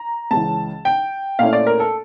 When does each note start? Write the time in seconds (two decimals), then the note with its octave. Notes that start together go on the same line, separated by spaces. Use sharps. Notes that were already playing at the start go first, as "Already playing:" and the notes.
Already playing: A#5
0.31 C#2 C#3 E3 A5
0.85 G5
1.39 A#2 A3 C#4 E4 F5
1.53 D5
1.66 A#4
1.80 A4